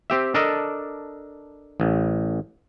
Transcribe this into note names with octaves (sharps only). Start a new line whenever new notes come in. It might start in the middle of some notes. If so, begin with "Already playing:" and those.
C4 G4 E5
D4 A4 A#4 D5 D#5
A1